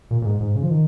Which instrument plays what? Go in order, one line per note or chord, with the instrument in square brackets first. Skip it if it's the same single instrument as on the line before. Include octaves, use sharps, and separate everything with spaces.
[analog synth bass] A#2
A#2
G#2
G#2
C#3
F3
D#3